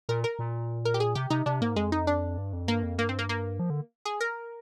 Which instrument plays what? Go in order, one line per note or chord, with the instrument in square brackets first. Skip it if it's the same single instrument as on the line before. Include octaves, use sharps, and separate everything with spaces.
[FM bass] A#2 [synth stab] A#4
[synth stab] A#4
[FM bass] A#2
[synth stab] A#4
G4
G#4
[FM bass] C3 [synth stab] G4
[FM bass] C3 [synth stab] D#4
[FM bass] C3 [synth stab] D4
[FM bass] G#2 [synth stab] A#3
[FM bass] F2 [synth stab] G#3
[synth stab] D#4
D4
[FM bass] G2
F2
[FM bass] G2 [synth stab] A#3
[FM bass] F2
[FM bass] G2 [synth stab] A#3
[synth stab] C4
A#3
A#3
[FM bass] F3
D3
[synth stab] G#4
A#4